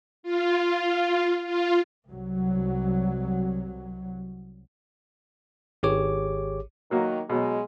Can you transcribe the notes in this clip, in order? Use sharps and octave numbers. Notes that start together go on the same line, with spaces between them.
F4
F4
C2 F#3
G#1 G4 G#4 C#5 D6
D#3 F#3 A#3 F#4
B2 F#3 G#3